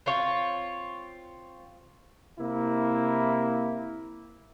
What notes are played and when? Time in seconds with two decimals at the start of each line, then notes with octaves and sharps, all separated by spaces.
0.06 C4 F4 C#5
2.39 C3 A#3 E4